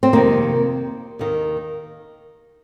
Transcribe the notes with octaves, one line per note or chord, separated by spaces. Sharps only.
C4
F2 C3 D#3 A#3
D#2 D#3